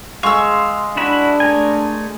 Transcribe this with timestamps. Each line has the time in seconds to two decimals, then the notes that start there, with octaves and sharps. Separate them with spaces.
0.23 G#3 F5 C#6 E6
0.97 D4 E4 F#4 B5
1.40 A3 A#4 G#5